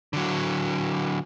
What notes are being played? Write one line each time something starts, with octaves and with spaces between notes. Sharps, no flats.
D3 F#3